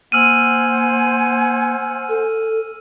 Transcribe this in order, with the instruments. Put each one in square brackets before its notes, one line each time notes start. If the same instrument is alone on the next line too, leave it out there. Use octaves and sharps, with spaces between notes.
[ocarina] A#3 [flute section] C5 F#5 G#5 [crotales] E6 F6 D#7
[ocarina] A4